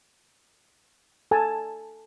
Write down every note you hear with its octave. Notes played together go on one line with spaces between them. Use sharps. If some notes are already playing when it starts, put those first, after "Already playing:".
A4 G#5 A5